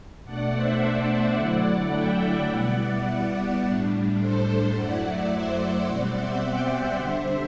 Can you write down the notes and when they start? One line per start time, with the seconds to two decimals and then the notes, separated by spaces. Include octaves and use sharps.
0.24 B2 A3 D4 D5 F#5
0.53 C5 E5
0.81 C5 E5
1.36 D3 F#3 A3 E4 D5 F#5
1.64 D5 F#5
1.92 E5 G5
2.48 B2 G3 B3 E4 D5 F#5
3.60 A2 G3 D4
4.16 A4 C5
4.72 F#2 F#3 A3 E4 D5 F#5
5.29 C5 E5
5.85 B2 G3 C4 D5 F#5
6.12 C5 E5
6.41 E5 G5
6.68 E5 G5
6.96 D3 G3 D4 C5 E5